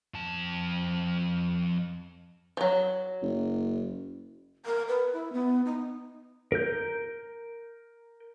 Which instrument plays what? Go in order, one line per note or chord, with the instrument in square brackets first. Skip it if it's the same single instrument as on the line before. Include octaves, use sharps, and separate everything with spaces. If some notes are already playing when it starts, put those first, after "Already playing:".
[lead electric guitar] F2 A5
[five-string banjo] F3 F#3
[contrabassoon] F#1
[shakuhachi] A#4
B4
E4
B3
D#4
[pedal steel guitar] A#4 G6